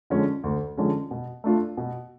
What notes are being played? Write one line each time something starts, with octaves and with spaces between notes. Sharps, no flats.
D3 F3 G#3 C#4
D2
D3 F3 G#3 C#4
B2
A3 D4 F4
B2